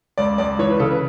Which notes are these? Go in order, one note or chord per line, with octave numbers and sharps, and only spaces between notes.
C#2 D5
C#2 D5
E3 C#5
B4
C#3 A4
B4